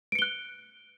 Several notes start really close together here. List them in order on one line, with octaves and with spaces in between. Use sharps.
D7 C#7 G7 F#6